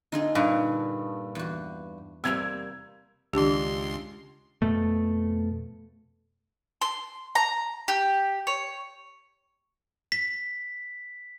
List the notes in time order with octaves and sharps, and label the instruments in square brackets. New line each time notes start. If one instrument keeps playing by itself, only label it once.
[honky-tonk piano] D3 [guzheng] D#4 F4 G#4
[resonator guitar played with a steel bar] G2 [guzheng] A#2
[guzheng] E2 F#4
[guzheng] C3 G3 A#3 [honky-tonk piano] E6 G#6 F7
[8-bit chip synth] C#2 C6 [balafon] D#3 G4 [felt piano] D4
[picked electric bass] F2 B2 A3
[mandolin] C6
A#5
G4
C#5
[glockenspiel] B6